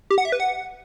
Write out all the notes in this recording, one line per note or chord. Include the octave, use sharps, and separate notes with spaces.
G4
F#5
E5
B4
F#5